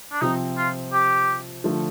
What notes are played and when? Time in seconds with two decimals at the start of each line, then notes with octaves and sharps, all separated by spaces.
0.12 D4
0.21 C3 F3 C4 D#4
0.57 F4
0.93 G4
1.64 D3 F3 A3